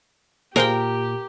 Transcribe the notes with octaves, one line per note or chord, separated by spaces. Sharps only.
A#2 G4 G#4 A#4 C5 F5 G5